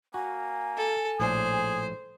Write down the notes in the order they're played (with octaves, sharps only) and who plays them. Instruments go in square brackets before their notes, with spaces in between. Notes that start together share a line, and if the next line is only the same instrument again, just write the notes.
[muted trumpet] A#3 [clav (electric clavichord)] F#4 [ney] G#5
[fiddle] A4
[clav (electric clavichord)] A#1 A2 D5 [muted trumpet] G#4 [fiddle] C5